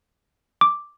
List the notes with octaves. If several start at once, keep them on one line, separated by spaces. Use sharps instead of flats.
D6